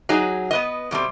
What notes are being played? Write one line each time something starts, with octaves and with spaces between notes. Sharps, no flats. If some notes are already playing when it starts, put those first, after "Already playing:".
F#3 D#4 G#4
B3 B4 D#5
B2 G3 A3 C4